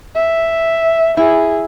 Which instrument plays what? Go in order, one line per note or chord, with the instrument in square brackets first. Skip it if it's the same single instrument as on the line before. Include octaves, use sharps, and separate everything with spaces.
[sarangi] E5
[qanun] E4 [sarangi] G#4